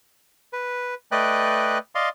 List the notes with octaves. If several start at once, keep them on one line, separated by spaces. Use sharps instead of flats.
B4
A3 B4 D5 D#5 G5 F#6
D5 D#5 F5 C6